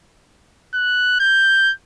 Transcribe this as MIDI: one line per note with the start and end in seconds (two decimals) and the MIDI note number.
0.74 1.15 90
1.20 1.72 91